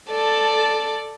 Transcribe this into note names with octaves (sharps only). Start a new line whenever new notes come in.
A4 D5 A5